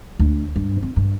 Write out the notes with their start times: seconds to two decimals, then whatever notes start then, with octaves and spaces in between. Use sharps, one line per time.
0.19 D2
0.56 G2
0.82 C4
0.96 G2